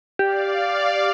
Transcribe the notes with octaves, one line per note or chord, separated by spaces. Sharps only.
G4 D5 F5